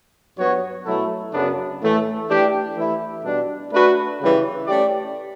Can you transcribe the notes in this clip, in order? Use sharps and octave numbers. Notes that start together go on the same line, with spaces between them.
G2 F#3 B3 F#4 C#5
B2 F#3 A3 E4 A4
F#2 C#3 F#3 B3 D4
A2 E3 A3
E3 A3 D4 G4
E3 A3 E4
B2 G3 D4
A3 D4 F#4 B4
C#3 E3 G3
A3 C#4 G4 D5